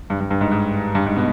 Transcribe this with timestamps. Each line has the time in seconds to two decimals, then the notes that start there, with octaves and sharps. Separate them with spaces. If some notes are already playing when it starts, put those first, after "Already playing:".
0.10 G2
0.20 G2
0.31 G2
0.41 G#2
0.52 G#2
0.95 G2
1.06 G#2
1.16 B2